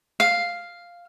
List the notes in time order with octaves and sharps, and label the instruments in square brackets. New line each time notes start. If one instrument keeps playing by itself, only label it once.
[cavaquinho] F5